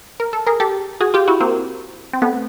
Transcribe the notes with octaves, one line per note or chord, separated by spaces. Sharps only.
A#4
A4
G#4 A#4
G4 A4
F#4 G#4
F4 G4
E4 F#4
A#3 C4
C4
A3 B3